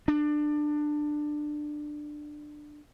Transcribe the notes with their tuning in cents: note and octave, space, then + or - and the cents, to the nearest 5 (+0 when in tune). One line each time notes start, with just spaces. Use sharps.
D4 +20